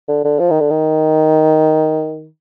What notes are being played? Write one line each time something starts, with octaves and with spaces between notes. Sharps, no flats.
D3
D3
F3
D#3
D3
D#3